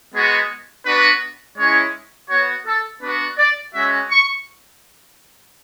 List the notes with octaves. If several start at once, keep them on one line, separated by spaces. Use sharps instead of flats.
G#3 B3 F#4 G#4
B3 D4 F#4 B4
G#3 C#4 E4 C#5
B3 F#4 C#5
A4
B3 D4 F#4 B4
D5
G#3 C#4 F#4 E5
C#6